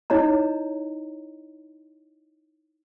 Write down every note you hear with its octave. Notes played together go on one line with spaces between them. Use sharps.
D#4 E4 C#5 D#5 A#5